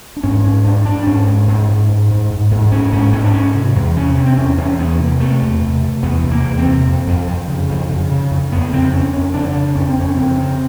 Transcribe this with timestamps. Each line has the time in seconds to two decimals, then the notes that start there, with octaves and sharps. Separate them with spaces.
0.16 D4
0.23 G#2 C#4
0.44 G#2 C#4
0.64 G#2 D4
0.85 G#2 D4
1.06 G#2 C#4
1.27 G#2
1.47 G#2
1.69 G#2
1.89 G#2
2.10 G#2
2.30 G#2
2.51 G#2
2.72 G#2 C#4
2.92 G#2 C#4
3.13 G#2 C#4
3.24 D4
3.34 G#2 C#4
3.55 C3
3.75 E2
3.97 C3 C#4
4.16 C3
4.26 C4
4.37 E2 C#4
4.58 E2 C#4
4.78 E2 B3
4.99 C3 A#3
5.20 C3 A3
5.41 E2
5.61 C3
5.82 C3
6.03 E2 B3
6.24 C3
6.31 A#3
6.45 E2
6.59 C4
6.65 C3
6.87 F2
7.07 F2
7.27 F2
7.48 C#3
7.69 F2
7.89 C#3
8.10 C#3
8.31 F2
8.52 F2 B3
8.73 C#3 C4
8.92 F2 C#4
9.13 F2 C#4
9.34 C#3 D4
9.55 C#3
9.76 F2 C#4
9.87 C4
9.97 F2 C#4
10.17 C#3 C4
10.38 C#3